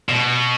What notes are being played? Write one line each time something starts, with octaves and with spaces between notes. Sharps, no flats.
B2